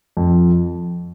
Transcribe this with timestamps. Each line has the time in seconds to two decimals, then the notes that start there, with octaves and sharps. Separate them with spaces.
0.17 F2